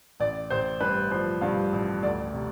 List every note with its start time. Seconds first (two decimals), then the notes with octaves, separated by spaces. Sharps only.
0.20 A1 D5
0.50 A1 C5
0.80 G2 B4
1.11 F3 C5
1.41 G2 F5
1.73 A1
2.03 D2 D5
2.33 C3